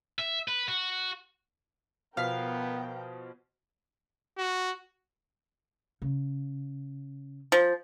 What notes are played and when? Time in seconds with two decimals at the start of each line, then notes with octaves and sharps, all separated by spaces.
0.19 E5
0.48 B4
0.68 F#4
2.17 B2 F3 B3 A#4 F5 G5 B6
4.38 F#4
6.02 C#3
7.52 F3